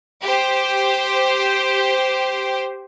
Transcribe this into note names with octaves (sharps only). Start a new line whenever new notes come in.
G4 C5